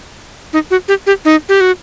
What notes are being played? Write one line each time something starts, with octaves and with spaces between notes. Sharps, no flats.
D#4
F#4
G4
G4
D#4
G4
F#4